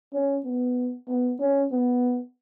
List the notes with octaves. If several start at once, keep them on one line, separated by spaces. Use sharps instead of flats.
C#4
B3
B3
C#4
B3